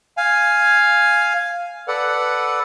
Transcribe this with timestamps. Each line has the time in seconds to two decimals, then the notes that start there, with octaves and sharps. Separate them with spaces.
0.17 F5 G#5
1.88 A4 B4 D5 F#5